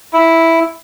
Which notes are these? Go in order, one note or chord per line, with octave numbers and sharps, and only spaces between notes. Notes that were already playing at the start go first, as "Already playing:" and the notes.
E4